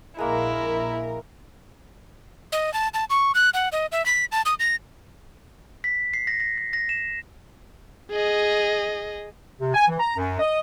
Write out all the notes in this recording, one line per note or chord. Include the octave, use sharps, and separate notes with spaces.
A#1 G#3 A#3 E4 A#4
D#5
A5
A5
C#6
F#6
F#5
D#5
E5
B6
A5
D#6
A#6
B6
C7
A#6
A#6
A#6
A#6
E7
G#4 D#5
C3
G#5
E3
A#5
F#2
D#5